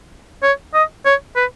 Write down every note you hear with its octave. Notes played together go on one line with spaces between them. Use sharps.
C#5
D#5
C#5
B4